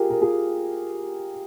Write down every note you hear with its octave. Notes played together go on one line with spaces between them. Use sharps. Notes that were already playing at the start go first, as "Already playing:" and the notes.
Already playing: F4 G4 G#4 A#4
A#4
F4 G#4